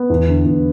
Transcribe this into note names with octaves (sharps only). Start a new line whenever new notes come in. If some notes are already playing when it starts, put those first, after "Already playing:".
Already playing: B3
E2
D3
E2